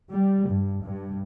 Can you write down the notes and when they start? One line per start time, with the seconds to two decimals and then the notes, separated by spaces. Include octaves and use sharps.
0.10 G3
0.47 G2
0.82 G2